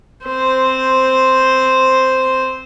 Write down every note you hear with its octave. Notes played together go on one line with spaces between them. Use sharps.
C4 C5